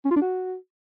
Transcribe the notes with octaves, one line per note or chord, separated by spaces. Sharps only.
C#4
F4
D4
F#4